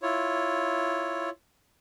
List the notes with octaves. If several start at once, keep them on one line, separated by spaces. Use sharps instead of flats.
E4 F4 C#5